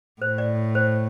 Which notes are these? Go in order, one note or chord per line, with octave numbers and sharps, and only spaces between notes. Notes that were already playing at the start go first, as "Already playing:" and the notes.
A2 C5
D5
C5